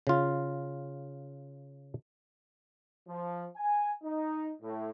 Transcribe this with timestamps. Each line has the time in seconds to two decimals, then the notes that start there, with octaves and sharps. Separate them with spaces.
0.07 C#3 F4
3.08 F3
3.56 G#5
4.02 D#4
4.62 A2